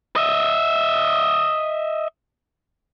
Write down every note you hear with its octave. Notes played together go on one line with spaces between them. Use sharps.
D#5 E5